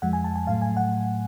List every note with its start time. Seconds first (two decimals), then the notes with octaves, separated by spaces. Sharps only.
0.02 F2 F3 G#3 F#5
0.13 G#5
0.24 A5
0.36 G#5
0.47 A2 F#3 A3 F5
0.62 G#5
0.77 F#5